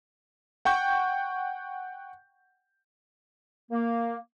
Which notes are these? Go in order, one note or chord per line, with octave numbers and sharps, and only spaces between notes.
F#5 G5 C#6 G6
A#3